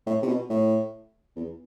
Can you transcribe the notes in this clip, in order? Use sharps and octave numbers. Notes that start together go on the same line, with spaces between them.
A2
C3
B2
A2
E2